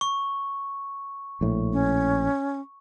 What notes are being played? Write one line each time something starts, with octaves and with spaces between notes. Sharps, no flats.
C#6
A#1 A2
C#4